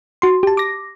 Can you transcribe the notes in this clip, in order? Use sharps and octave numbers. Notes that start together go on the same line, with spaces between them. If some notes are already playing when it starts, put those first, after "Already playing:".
F#4 C6
G4 A5
D6 A#6